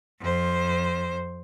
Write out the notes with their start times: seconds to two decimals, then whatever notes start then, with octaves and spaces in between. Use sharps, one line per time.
0.20 F2 C5